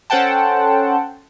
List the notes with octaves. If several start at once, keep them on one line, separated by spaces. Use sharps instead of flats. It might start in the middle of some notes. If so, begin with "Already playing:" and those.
C#4 A4 C5 F#5 G5 A5